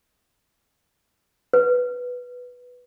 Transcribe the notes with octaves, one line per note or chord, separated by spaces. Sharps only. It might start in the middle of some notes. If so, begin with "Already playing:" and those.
B4